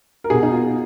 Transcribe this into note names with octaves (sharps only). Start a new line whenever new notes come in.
A#4
B2 G#4
D#4
F4